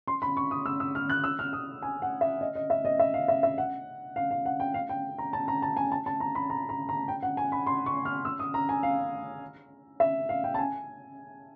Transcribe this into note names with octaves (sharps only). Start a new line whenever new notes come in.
C6
B5
C#6
D#6
E6
E6
F6
F#6
E6
F6
D#6
G#5
F#5
E5
D#5
D#5
E5
D#5
E5
F5
E5
E5
F#5
F5
F5
F#5
G5
F5
G5
A#5
A5
A#5
A5
G#5
A5
A5
A#5
B5
A#5
A#5
A#5
G5
F#5
G#5
B5
C6
C#6
F6
E6
D#6
A#5
G#5
F5
E5
F5
G5
A5
G#5